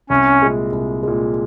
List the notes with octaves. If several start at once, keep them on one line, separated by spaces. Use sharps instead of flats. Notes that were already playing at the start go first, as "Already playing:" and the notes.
C2 C#4
A#2 G#3
C2
A#2 G#3